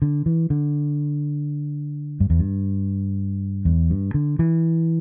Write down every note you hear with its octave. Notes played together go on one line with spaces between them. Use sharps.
D3
E3
D3
G2
E2
G2
E2
G2
D3
E3